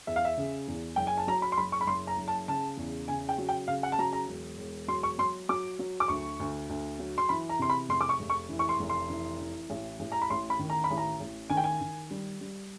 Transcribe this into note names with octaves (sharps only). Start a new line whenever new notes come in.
E2 E5
F5
E5
C#3
E2
F#1 G5
G#5
A5
F#3 A#5
B5
C6
F#1 B5
C#6
B5
F#1 C6
A#5
F#1
A5
C#3 A5
E2
C#3 G#5
G5
F#3
G5
C#3 F5
F#5
A5
F#3 A#5
A#5
E1
E1
F#3 C6
C#6
F#3 C6
F#3 D6
F#3
D6
D2 C#6
D2
D2
F#3
C6
E3 B5
A#5
C3 C6
B5
F1 C6
D6
C#6
F1
C#6
E3
C#6
C6
F1
C6
E3
E3
A1
A1
A#5
B5
A1 C6
B5
D#3
A#5
B5
A1
A#5
A1
D#3 G#5
G5
G#5
D#3
G3
G3